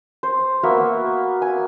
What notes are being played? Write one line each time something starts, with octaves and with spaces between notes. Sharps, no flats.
C5
A#3 B3 F#4 E5
G#5